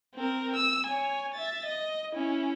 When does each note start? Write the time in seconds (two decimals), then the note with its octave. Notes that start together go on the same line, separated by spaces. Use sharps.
0.15 C4 A#4
0.55 E6
0.86 C#5 G#5
1.34 E5 A6
1.65 D#5
2.13 C#4 E4